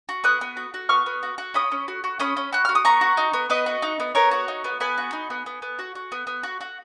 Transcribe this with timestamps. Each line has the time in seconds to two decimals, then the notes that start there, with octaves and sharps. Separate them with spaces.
0.09 F#4
0.24 B3 D#6 F#6
0.41 B3
0.57 F#4
0.74 F#4
0.89 B3 C#6 F6
1.06 B3
1.23 F#4
1.38 F#4
1.54 C#4 B5 D#6
1.72 C#4
1.88 F#4
2.04 F#4
2.19 C#4 B5 D#6
2.37 C#4
2.53 F#4 F#6
2.65 F#4 F6
2.75 D#6
2.85 B3 A#5 C#6
3.01 F#4
3.17 D#4
3.33 B3
3.50 B3 B4 D#5
3.66 F#4
3.82 D#4
4.00 B3
4.15 B3 A#4 C#5
4.31 F#4
4.48 D#4
4.64 B3
4.80 B3 G#5 B5
4.98 F#4
5.13 D#4
5.30 B3
5.46 B3
5.62 B3
5.79 F#4
5.95 F#4
6.12 B3
6.27 B3
6.43 F#4
6.61 F#4